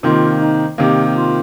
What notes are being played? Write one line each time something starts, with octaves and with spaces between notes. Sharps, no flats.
C3 D#3 A#3 F4
D#4
C3 D#3 A#3 G4
F4